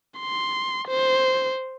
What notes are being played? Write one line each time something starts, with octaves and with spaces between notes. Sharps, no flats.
C6
C5